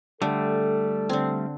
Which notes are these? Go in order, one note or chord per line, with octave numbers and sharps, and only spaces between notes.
D3 G3 A3 A4
D3 C4